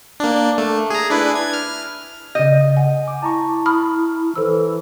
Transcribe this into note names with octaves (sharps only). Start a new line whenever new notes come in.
A#3 D4
A3
G#4 A#5
D4 E4 B4
G#6
F6
C#3 D#5 G6
F#5 G#5
D6
E4 A5 A#5 C#6
B5 D#6 F6
E3 A4 C5 E6